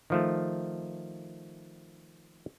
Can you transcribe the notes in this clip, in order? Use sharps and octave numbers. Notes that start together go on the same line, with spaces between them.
D#3 F3 A3